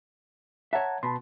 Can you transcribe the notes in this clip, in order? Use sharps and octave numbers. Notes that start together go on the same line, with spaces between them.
C#5 E5 F#5 A5 A#5
B2 A5 B5 C6